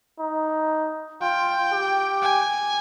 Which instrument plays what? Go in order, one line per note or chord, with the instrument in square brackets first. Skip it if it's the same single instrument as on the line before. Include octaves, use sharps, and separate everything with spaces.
[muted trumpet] D#4
[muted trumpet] F4 [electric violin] G5
[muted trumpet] G4
[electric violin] G#5